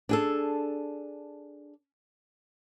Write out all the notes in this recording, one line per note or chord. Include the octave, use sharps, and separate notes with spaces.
D4 G#4 A4